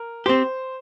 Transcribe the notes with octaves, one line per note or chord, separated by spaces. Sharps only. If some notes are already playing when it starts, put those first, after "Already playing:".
Already playing: A#4
C4 G4 C5